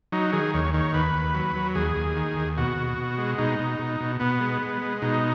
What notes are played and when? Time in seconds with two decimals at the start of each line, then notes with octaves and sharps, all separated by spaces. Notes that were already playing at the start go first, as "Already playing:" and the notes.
0.12 F#3 D#4
0.33 D#3 G#4
0.54 D#2 C#5
0.74 D#3 C#5
0.94 D#2 B4
1.14 D#2
1.34 F#3
1.56 F#3
1.75 D#2 G#4
1.96 D#2
2.16 D#3
2.36 D#2
2.58 B2 F#4
2.77 B2
2.98 B2
3.18 G#3
3.38 B2 D#4
3.59 B2
3.79 B2
4.01 B2
4.20 B2 B3
4.40 G#3
4.62 G#3
4.81 G#3
5.02 B2 D#4